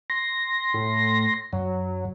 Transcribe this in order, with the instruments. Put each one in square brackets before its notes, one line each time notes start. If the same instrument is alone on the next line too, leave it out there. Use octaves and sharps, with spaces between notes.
[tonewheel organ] C6 A#6
[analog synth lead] A2
[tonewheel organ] F#2 [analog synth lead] F#3